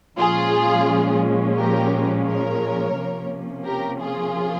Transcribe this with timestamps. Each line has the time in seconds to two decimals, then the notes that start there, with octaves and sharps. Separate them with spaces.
0.17 A#2 F3 G#3 C#4 F4 G#4
1.57 G4 A#4
2.26 A#4 C#5
2.96 C3 F3 A#3 C#4
3.65 G4 A#4
4.00 F4 G#4